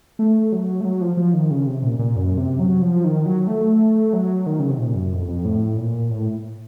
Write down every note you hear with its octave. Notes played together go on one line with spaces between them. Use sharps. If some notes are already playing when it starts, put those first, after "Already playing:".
A3
F#3
A3
F#3
F3
F3
D#3
C#3
C3
A#2
A#2
F#2
C3
F#3
F3
D#3
F#3
A3
F#3
D#3
C#3
C3
A#2
F#2
F2
F2
A2
A#2
A2